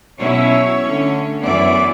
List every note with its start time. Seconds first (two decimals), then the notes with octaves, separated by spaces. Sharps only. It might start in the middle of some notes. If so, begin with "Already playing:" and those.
0.20 B2 F#3 C#4 E4 C#5
0.82 D3 A3 C#4
1.43 F#2 E3 B3 E4 D5